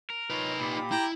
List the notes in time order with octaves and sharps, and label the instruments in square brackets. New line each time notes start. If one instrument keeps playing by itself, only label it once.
[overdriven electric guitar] A#4
[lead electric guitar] D#4 B4 [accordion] F4 C#5 D#5
[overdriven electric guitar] A#2 [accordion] G4 B5
[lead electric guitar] E4 [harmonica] G5 A#5